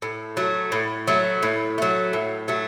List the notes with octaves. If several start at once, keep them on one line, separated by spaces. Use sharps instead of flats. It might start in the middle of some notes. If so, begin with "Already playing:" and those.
A2
F#3 A3
A2
F#3 A3
A2
F#3 A3
A2
F#3 A3